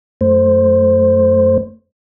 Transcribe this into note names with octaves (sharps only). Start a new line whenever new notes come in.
F#2 A3 C5